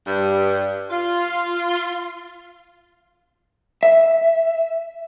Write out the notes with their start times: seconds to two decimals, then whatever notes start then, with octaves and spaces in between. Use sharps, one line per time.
0.07 G2
0.91 F4
3.83 E5